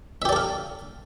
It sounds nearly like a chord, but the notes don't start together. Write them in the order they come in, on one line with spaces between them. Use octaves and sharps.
E5 G4 D5 A4 F5